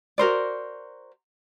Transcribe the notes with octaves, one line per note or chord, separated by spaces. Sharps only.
F#4 A#4 C5 D5